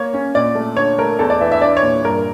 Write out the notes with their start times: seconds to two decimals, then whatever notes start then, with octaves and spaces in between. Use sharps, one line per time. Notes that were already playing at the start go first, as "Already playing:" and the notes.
Already playing: A#3 C#5
0.14 C#4
0.35 A#2 D5
0.55 A3
0.77 D3 C#5
0.99 A3 A#4
1.19 E2 A4
1.30 D5
1.41 E3 E5
1.52 E5
1.61 D4 D5
1.77 C#5
1.83 A#2
2.04 G2 A#4